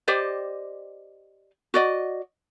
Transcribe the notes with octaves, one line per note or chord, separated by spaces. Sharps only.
G4 C5 D5 D#5
F#4 D5 D#5